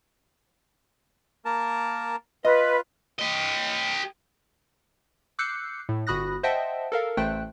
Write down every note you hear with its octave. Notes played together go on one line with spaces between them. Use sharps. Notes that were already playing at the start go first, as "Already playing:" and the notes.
A#3 A#4 A5
F4 B4 D#5
G4 D#5
D6 E6 F#6 G6 C7 C#7
A2
G1 F#4 B5 D#6 F#6 A#6
C5 D#5 E5 F#5 G5 A5
A4 A#4 F5
A1 A3 C5 G5 F#6